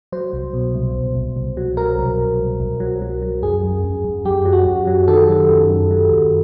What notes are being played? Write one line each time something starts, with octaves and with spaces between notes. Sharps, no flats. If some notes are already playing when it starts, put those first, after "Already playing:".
F#3 C5
C2
B2
C2
C2
C2
C2
F#3
F#3 A#4
C2
C2
C2
C2
F#3
F#3
F#3
F#2 G#4
F#2
F#2
F#2
F#2 G4
F#3
F#4
F#2
F#3
D#3 A4
F#3
F#2
F#2
F#3
F#2